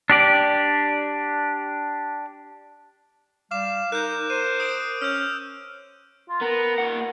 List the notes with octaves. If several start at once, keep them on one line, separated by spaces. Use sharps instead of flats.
D4 G4 D5
G3 F5 D6 E7
D#4 A#4 F#6 G6
C5 D#7
D#6 D7
C#4 E6 F6 G6
F4
B3 A#4
A#2 F#5